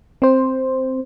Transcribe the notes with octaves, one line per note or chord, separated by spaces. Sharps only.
C4 C5